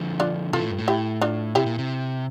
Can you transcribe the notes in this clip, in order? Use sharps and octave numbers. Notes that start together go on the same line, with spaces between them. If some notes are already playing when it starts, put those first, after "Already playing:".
Already playing: D3 F3
D4 F4
C3 E3 F4 A4
A2
G2
A2
E4 G4
D4 F4
C3 E4 G4
A#2
C3